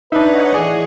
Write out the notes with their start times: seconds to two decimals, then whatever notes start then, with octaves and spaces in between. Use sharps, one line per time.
0.12 D4 D#4 B4 C#5 D#5 E5 F#5
0.54 A2 E3 G#4 D5